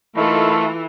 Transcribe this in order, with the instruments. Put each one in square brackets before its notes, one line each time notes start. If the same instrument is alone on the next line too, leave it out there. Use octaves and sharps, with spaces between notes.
[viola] E3 [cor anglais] A3 [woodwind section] D#4 A#4 B5 [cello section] F4 A4